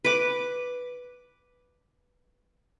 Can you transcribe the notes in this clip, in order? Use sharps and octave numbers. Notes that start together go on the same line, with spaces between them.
B4 D6